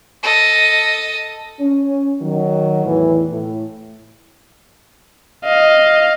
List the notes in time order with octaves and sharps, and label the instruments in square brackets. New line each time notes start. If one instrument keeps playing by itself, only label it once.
[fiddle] A4 D#5
[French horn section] C#4
D#3 F#3
E2 A2 E3
A2
[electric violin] D#5 F5